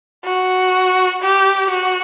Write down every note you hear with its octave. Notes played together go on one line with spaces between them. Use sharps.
F#4
G4
F#4